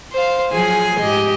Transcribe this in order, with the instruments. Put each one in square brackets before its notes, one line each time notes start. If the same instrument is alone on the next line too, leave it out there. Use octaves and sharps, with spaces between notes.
[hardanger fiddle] C5 F5
[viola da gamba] F3 F#3 G#4 [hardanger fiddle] G#5
[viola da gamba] G#2 G4 D#5